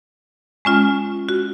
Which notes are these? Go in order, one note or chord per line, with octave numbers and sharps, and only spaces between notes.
G#3 C#4 F4
F#4